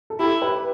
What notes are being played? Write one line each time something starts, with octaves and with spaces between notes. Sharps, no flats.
A4
E4 G4
B4